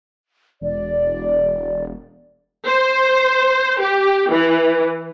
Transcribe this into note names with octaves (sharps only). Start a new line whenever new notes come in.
E1 D5
C5
G4
E3